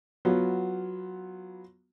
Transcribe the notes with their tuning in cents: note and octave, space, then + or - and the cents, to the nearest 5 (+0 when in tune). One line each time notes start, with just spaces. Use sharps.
F#3 +0 B3 +0 F4 +0